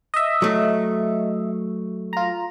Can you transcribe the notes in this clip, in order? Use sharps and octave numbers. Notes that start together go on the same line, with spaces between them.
D#5 E5
F#3 A3
F4 A#5